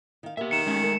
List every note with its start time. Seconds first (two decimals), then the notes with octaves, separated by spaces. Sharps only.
0.23 D#3 F5
0.37 A#3 B3 G4 E5
0.51 D#3 C#7 E7
0.66 G#3 A3 C#4 D#4 G4
0.82 A#4